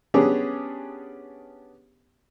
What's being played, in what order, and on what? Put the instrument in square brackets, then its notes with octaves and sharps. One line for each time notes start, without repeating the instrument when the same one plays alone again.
[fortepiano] B3 C#4 D4 G4 G#4